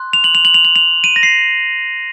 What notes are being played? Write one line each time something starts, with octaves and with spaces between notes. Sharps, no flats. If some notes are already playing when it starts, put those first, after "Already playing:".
Already playing: C6 F#6
F7
F#7
F7
F#7
F7
F#7
F7
D#7
A#6
C7